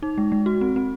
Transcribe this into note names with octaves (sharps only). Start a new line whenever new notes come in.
D#4
G#3
G#3
F#4
C4
C4